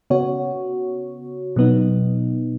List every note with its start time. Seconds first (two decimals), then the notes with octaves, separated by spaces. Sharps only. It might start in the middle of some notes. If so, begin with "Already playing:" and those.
0.10 C#3 B3 F#4 C#5
1.56 B2 F#3 B3 D#4